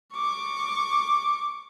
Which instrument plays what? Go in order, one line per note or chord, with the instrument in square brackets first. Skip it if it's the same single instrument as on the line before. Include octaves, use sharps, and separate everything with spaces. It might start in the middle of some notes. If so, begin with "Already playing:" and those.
[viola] C#6 D6